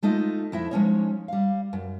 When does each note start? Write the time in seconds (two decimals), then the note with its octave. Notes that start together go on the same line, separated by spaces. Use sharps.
0.02 G#3 A3 D#4 F4 D#5
0.52 F2 E4 D#5 E5
0.71 F3 G#3 A#3 C#4 D#4 C#5
1.28 G3 F5
1.73 F#2